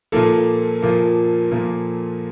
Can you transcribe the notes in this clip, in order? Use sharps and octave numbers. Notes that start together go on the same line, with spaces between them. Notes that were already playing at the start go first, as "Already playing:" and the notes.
A#2 F3 A#3 A4
A#2 F3 A#3
A#2 F3 A#3